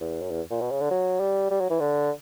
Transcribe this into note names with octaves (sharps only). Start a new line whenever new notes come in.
E2
F#2
E2
A#2
B2
C#3
D3
F#3
G3
G3
F#3
E3
D3